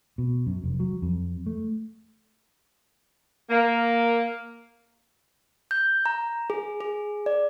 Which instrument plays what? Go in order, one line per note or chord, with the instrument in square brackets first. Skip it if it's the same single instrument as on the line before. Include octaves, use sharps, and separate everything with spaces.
[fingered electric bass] B2
F#2
F1
F#3
F2
A3
[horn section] A#3
[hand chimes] G6
A#5
G#4
G#4
D5